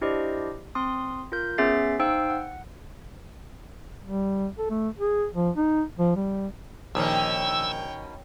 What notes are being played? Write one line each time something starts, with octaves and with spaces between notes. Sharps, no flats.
D4 E4 G4 C5 D5 D#5
C4 C6 D#6
F4 A#4 G6
B3 C#4 G#4 E5 A6 C7
D#4 C5 F5 G5 E6
F#5
G3
A4
A3
G#4
F3
D#4
F3
G3
A#1 B2 D#3 C#4 C#5 G5 E6